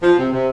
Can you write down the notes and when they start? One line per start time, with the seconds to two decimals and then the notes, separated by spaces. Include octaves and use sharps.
0.02 F3
0.18 C3
0.32 C3